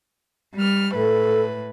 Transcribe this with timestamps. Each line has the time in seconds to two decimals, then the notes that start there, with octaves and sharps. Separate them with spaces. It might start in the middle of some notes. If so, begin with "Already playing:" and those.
0.54 G3 F6
0.95 A2 A4 B4